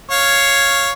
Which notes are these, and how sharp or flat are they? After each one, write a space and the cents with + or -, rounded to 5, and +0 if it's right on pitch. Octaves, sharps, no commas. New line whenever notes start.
C#5 +0 F5 +0